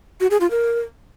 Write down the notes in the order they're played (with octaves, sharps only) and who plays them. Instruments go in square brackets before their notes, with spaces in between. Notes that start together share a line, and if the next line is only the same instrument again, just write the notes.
[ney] F#4
G#4
F4
A#4